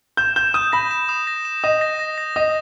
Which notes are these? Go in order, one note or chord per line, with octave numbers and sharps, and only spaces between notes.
G6 E7
G6 E7
D#6 G6
B5 A#6
E7
D#6
A#6
E7
D#5 D#6
A#6
A#6
A#6
D#5 D#6